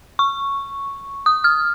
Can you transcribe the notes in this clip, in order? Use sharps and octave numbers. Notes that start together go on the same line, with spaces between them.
C#6
D#6
F6